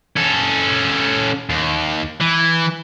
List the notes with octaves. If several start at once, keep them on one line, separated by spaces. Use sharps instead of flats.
C#4 A4
D#2
E3